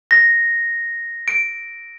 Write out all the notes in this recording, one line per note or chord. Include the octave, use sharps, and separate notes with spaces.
A#6
D7